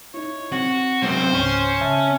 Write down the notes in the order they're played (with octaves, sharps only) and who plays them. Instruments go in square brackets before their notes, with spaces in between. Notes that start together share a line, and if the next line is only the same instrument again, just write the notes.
[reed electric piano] D#4 E4 [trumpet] C#5
[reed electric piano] C4 [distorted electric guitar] F#4
[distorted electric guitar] F#2 C4 [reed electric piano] C3 G#3 B3 [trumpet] C5
[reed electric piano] C#2 G#2 [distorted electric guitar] C#4
[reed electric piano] C#3 E5 A5